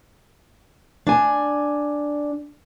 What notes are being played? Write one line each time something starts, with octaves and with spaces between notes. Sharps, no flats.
D4 G#5